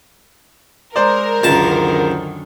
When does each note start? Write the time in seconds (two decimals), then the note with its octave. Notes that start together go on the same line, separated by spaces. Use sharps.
0.96 G#3 A#4 C5 D5
1.44 C#2 F#2 D3 D#3 A5